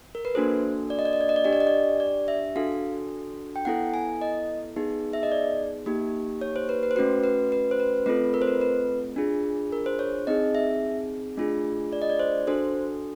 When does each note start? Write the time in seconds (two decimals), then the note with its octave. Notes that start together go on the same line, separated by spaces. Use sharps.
0.15 A#4
0.25 B4
0.35 A#3 D4 F#4 A4 C5
0.90 D5
0.99 D#5
1.05 D5
1.13 D#5
1.21 D5
1.29 D#5
1.36 D5
1.45 D4 G4 D#5
1.53 D5
1.60 D#5
1.67 D5
2.00 D5
2.28 E5
2.56 D4 F#4 A4 F5
3.56 G5
3.65 B3 E4 A4 F#5
3.94 G#5
4.21 D#5
4.76 B3 D#4 G#4
5.13 E5
5.23 D#5
5.32 D5
5.86 A#3 D#4 G4
6.41 C#5
6.56 C5
6.69 B4
6.83 B4
6.91 C5
6.96 A3 C#4 F#4 B4
7.24 B4
7.52 B4
7.71 C5
7.80 B4
8.06 A3 C4 F4 A4 B4
8.34 A#4
8.42 C5
8.47 B4
8.61 B4
9.16 D4 F4 G#4
9.72 A#4
9.86 C5
9.99 C#5
10.27 C4 D#4 G#4 D#5
10.55 E5
11.37 A3 D4 F4 G#4
11.93 D5
12.02 D#5
12.10 D5
12.19 C5
12.47 D4 F#4 A4 C5